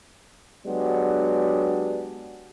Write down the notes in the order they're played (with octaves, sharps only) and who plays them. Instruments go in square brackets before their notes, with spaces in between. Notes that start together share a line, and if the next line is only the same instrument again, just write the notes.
[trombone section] F#3 G#3 B3 D4 G4